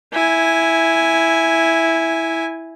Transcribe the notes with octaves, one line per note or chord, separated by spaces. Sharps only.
E4 G#5